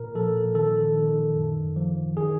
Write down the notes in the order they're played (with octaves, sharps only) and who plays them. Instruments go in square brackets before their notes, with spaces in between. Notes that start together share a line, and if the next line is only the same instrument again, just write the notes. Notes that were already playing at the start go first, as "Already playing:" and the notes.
Already playing: [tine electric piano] A#2 A#4
F3 A4
D#3 A4
D#3
F#2
F3
D#3 G#4